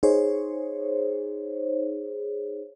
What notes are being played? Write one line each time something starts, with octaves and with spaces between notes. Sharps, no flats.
D#4 G#4 C5 C#5